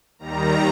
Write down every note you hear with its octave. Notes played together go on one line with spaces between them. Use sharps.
D#2 D#3 G3 A#5